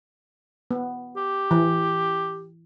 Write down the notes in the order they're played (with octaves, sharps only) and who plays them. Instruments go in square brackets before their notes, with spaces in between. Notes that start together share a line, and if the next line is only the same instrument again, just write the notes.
[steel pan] B3
[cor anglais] G4
[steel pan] E3